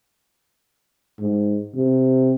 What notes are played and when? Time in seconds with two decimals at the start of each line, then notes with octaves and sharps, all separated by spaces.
1.20 G#2
1.75 C3